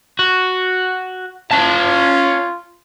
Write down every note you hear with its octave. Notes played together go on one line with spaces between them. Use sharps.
F#4
C#4 F4 A5